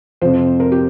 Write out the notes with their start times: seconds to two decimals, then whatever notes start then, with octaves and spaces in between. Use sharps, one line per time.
0.22 F2 C3 F3 C5
0.60 A#4
0.72 G4